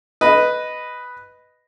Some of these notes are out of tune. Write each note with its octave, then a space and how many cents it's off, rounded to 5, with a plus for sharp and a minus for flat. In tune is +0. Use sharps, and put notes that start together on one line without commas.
B4 +0 D#5 +0